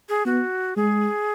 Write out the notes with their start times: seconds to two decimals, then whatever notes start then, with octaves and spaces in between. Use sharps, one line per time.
0.09 G#4
0.25 B3 F#4
0.76 G#3 G#4